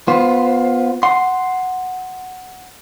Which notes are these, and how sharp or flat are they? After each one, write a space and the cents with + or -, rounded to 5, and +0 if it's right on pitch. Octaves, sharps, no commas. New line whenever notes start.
B3 +0 F4 +20 C5 +0
F#5 +0 C6 +0